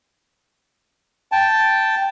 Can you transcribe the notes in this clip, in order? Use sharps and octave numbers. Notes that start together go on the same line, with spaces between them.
G5 A5